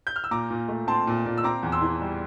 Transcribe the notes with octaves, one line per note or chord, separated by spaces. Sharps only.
G6
F6
E6
A#2 A#5 D6
A#2
A3
C4 A5 C6
A#2
A#2
E6
C4 A#5 D6
E2
C6 E6
E3
G3